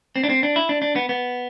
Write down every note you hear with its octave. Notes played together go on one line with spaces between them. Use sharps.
C4
D4
C4
D4
E4
D4
D4
B3
B3